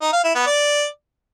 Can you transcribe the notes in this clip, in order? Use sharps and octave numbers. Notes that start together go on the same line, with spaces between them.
D#4
F5
E4
B3
D5